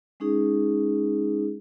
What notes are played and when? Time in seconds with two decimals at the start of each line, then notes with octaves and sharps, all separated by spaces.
0.20 G#3 C#4 D#4 G#4